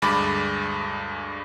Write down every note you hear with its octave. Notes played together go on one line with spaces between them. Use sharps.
D2 G2 G#3 B5 D6 A6